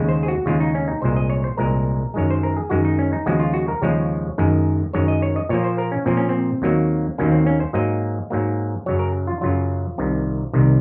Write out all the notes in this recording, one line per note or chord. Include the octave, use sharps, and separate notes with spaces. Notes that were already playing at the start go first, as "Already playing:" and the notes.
Already playing: D#2 C#3 G#3
C5
G#4
F#4
D#2 C#3 G#3 F4
D#4
C#4
D#4
C2 A#2 G#3 C5
D#5
C#5
C5
C2 A#2 G#3 A#4
F#2 D#3 G#3 C#5
C5
A#4
G#4
F#2 D#3 G#3 F#4
D#4
C#4
D#4
D#2 C#3 F3 G#3 F#4
F4
F#4
A#4
D#2 C#3 F3 G#3 C#5
F#2 D#3 G#3
F#2 D#3 G#3 C#5
D#5
C#5
D#5
A#2 F3 A#3 C#5
C5
A#4
C#4
A#2 F3 A#3 C4
C#4
C4
D#2 D#3 F#3 A#3
D#2 D#3 F#3 A#3 C#4
C4
C#4
C5
G#2 F#3 A#3 D#5
G#2 F#3 A#3
F#2 C#3 F#3 C#5
A#4
F4
F#2 C#3 F#3 F4
C2 C3 D#3
C2 C3 D#3